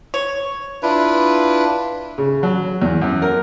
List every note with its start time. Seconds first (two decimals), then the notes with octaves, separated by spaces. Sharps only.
0.14 C#5
0.83 D4 E4 F4 B4
2.18 C#3
2.43 F#3
2.82 E2
3.02 F#2
3.22 A#4